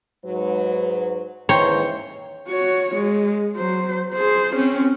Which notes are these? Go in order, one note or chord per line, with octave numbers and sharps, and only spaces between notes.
G#2 F#3 B4
D#2 G#2 E3 C#5 G5 A#5 C6
F#4 C#5
G#3
F#3 C5
G#4 C5
C4 C#4